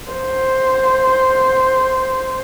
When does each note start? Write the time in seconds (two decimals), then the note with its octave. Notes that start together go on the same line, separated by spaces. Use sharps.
0.12 C5